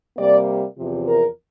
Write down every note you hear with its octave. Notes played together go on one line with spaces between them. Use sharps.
C3 G3 A#3 D5
E2 C3 F3
A#4